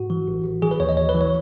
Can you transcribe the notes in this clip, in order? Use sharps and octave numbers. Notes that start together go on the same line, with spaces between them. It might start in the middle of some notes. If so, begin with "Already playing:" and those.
Already playing: G#2 F#4
E3
A1
A1
E3 G#4
B4
D#2 C#5
D#5
G#1 C#5
B4
E3
C#5